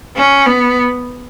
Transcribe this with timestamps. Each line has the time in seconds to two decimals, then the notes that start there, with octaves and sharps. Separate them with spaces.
0.17 C#4
0.46 B3